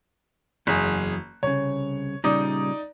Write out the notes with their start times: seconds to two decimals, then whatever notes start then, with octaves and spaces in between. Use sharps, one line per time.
0.67 F#1 E2 F#3 G#4
1.43 C2 C#3 C#5
2.24 A#2 C#3 G3 D#4 D5 D#6